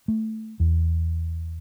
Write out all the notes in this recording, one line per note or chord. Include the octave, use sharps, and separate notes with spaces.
A3
E2